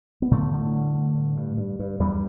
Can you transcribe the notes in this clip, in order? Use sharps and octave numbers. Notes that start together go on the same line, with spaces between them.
B3
A2 D3 A3
D3
G2
D3
G2
G2
G2
G2
E2 G2 G3